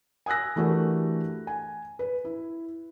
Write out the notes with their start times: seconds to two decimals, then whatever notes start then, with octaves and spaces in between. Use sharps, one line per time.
0.26 G#5 D#6 E6 F#6 A#6
0.56 E3 A3 D4 F#4 G4 A#4
1.47 G#5
1.99 B4
2.25 E4